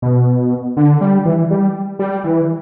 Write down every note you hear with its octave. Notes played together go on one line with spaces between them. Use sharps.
B2
D3
G3
E3
G3
G3
E3